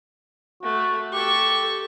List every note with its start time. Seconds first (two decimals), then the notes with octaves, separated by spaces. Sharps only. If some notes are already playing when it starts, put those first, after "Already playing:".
0.63 A3 F#4
1.13 G4 A4 C#6